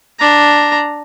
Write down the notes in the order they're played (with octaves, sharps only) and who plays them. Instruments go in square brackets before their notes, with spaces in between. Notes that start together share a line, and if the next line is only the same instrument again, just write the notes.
[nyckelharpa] D4 A#5